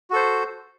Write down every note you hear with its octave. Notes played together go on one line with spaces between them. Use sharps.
F#4 A4 C5